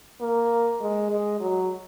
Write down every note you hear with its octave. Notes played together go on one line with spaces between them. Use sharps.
A#3
G#3
G#3
F#3